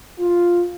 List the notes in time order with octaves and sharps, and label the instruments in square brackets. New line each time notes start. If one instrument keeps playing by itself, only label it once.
[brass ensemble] F4